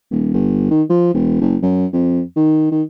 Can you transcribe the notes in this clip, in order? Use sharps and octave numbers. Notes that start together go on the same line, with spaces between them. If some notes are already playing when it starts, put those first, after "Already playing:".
D#1
G1
D#3
F3
E1
F#1
F#2
F2
D#3
D#3